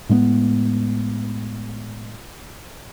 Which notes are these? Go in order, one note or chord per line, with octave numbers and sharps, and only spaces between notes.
A2 G#3 A#3 B3